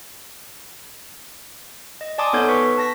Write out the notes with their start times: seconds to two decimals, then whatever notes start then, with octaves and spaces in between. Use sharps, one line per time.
2.01 D#5
2.18 D5 G#5 A5 C6 D6 D#6
2.33 B3 D#4 A4 C#5 G6 G#6
2.49 B4 C#6 B6
2.78 A5 A#6 B6